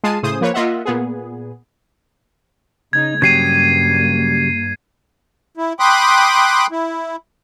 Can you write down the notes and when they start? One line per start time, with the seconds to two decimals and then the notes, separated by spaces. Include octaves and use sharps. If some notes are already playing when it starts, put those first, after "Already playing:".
0.04 G#3 F4 G#4 A5 C7 D#7
0.23 A2 C#3 G#4 C5 D#6
0.41 F3 A#3 B4 C#5
0.54 A#3 F4 D#5 E5 F#5
0.85 A#2 B3 G#4
2.93 C#3 D#4 G#6
3.22 G2 C#3 F#3 A#3 G4 G#6 C7 D#7
5.57 E4
5.79 G5 B5 C6 D6 D#6 F#6
6.72 E4